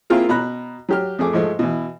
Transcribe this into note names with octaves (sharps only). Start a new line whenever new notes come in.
A#3 C4 E4 F4 G#4 A#4
B2 A#5 B5 F#6
F#3 G4 F6
F2 A3 G#4 D6
G#2 F3 G#3 A3
B2 E3